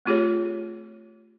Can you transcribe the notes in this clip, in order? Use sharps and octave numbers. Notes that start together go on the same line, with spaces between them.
A3 C4 F4 G4 G#4 C#5